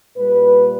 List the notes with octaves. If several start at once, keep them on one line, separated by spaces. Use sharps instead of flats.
A#2 G3 B4